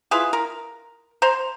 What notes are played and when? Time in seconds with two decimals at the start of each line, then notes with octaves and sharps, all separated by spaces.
0.11 E4 F4 G#4 B4
0.33 A#4
1.22 C5 A#5 C6